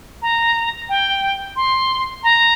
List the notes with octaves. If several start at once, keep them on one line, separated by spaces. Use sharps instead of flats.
A#5
G5
C6
A#5